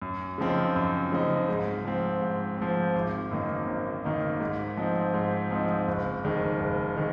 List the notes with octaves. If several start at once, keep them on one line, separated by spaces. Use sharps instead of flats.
F#2
C#3 F3 C4 D#4
F#2
C#3 F3 C4 D#4
G#2
F3 C4
G#2
F3 C4
G#1
F#2 D#3 A#3 D#4
G#1
F#2 D#3 A#3 D#4
G#2
F3 C4 D#4
G#2
F3 C4 D#4
F#1
F2 D#3 G#3
F#1
D#3 G#3